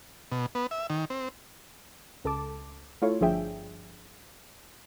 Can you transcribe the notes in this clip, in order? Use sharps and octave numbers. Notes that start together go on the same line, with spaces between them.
B2
B3
E5
D#3
C4
C#2 A4 A5 D6
A3 E4 F4 A4 C#5
G1 F3 D4 G#4 E5 G5